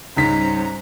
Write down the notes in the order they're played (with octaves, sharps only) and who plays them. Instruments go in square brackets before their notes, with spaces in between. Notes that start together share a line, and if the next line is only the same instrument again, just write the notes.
[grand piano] C#2 G#2 B6 [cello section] G3 C#4 C5 [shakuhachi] A#5